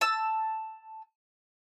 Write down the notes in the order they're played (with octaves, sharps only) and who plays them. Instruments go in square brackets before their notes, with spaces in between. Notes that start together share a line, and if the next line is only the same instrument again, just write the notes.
[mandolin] A5 E6